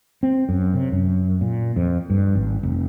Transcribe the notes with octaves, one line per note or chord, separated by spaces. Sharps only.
C4
F#2
C3
F#2
A#2
F2
G2
G#1
F1